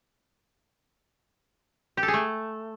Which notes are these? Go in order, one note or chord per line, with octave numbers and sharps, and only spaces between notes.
G4
A4
G#4
A3